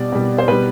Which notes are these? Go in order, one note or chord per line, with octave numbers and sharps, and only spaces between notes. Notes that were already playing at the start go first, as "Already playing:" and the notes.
Already playing: B2 G3 D5
B2 G3
C5
B2 G3 B4